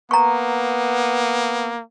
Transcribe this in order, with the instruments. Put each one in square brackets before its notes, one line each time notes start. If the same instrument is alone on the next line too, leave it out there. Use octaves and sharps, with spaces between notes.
[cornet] A#3 [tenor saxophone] B3 [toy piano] A#5 C#6